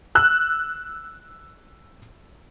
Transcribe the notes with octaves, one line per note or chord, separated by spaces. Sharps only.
E6 F#6